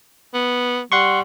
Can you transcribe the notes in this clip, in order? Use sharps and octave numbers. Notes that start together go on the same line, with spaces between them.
B3
G3 F#5 C6 C#6